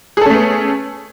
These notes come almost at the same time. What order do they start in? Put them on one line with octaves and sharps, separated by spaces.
G#4 A4 C#4 A3 B3